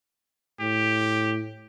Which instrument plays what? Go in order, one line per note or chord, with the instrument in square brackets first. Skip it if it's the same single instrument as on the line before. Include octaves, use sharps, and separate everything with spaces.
[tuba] A2 [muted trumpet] G4